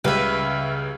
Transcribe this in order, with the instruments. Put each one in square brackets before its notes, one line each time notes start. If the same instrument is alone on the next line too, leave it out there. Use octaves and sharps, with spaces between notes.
[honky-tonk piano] C#2 C#3 G3 [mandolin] B4 E5